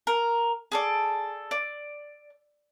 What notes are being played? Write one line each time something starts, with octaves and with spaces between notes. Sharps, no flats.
A#4
G#4 A4 D5
D5